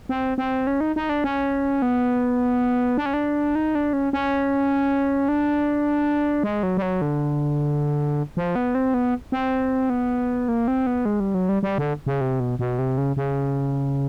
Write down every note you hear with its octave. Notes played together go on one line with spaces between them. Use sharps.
C4
C4
C#4
D#4
D#4
D4
C#4
B3
D4
C#4
D4
D#4
D4
C#4
C#4
D4
G#3
F#3
G3
F#3
D3
F3
B3
C4
B3
C4
B3
A#3
C4
B3
G#3
G3
F#3
G3
G3
D3
C#3
C3
B2
B2
C3
C#3
C#3